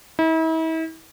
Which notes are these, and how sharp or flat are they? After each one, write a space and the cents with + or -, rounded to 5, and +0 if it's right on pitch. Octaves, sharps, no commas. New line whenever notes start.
E4 -40